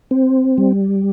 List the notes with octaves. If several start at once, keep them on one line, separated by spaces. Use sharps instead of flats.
C4
G3